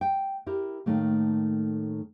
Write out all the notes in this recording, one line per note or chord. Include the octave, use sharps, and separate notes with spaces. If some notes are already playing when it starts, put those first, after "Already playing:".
G5
E4 G4 A#4
A2 D#3 A3 A#3